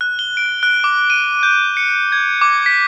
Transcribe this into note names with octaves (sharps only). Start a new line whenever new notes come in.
F#6
G7
D7
F#6
D6
D#7
G6
C#7
G#6
D6
B6